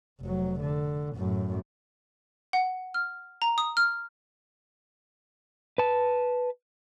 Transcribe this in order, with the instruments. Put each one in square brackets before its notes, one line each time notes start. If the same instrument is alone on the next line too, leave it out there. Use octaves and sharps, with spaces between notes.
[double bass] F1 F#3
D3
F#2 A2
[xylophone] F#5
F6
A#5
D#6
F6
[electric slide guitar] B4 A5